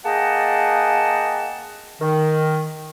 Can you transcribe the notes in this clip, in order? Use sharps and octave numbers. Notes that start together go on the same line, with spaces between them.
A#3 G#4 D#5 F#5 G5 A5
D#3